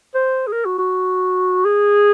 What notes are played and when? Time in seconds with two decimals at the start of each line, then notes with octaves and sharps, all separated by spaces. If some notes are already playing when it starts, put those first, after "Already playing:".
0.15 C5
0.47 G#4
0.52 A#4
0.65 F#4
0.78 F#4
1.65 G#4